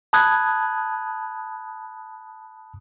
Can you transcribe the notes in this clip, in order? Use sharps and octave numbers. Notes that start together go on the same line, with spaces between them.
A5 B5 D#6 F#6 G#6